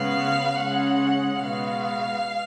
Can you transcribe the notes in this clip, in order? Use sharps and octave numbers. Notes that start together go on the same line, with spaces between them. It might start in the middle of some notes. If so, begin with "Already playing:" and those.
Already playing: C#3 G#3 B3 F5
C#3 G#3 C#4 F#5
B2 G#3 B3 F5